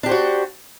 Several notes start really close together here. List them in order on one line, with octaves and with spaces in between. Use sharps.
D4 G4 C5 F#4